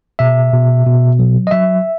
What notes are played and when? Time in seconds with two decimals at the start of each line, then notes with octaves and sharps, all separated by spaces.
0.19 B2 E5
0.53 B2
0.86 B2
1.19 F#3
1.47 D#5
1.51 F#3 E5